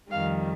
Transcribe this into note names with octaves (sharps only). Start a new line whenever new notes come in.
F2 D#3 G3 F5